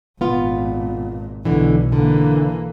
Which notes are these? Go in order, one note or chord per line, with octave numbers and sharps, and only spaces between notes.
G#1 A#2 B3 F4
B1 B2 D3 E3
D3 E3 A#3